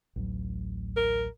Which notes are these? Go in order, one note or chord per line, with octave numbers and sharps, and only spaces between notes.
A1 D2 F#3
A#4